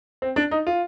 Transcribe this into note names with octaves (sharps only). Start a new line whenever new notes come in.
C4
D4
D#4
F4